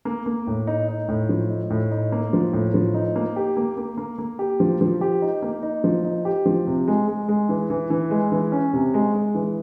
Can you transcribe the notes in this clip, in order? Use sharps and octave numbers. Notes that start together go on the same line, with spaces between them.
A#3
A#3
A2
D#4
D#4
A2
F3
D#4
A2
D#4
A#3
F3
A2
F3
D#4
A#3
G4
A#3
A#3
A#3
A#3
G4
F3
F3
G4
D#4
A#3
D#4
F3
D#4
G4
F3
C3
G#3
G#3
G#3
E3
E3
E3
G#3
E3
C#4
C3
G#3
G#3
E3